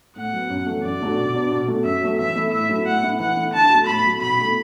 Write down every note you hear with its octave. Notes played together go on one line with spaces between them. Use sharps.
A2 F#5
F#3 B3
F#2
E3 A3
F#2 D5
D3 A3 D4 F#4
B2
B3 D4 F#4
B2
A3 F#4
F#2 E5
F#3 A3
E3 E5
A3 E4
A2 E5
F#3 A3 E4
A2 F#5
A3 E4
E3 F#5
A3 E4
D3 A5
F#4
A3
A2 B5
F#3 A3 F#4
B2 B5
A3 E4